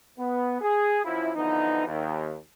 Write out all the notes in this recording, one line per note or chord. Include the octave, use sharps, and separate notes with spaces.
B3
G#4
F#2 F3 E4
D3 E3 F3 B3 D#4
D#2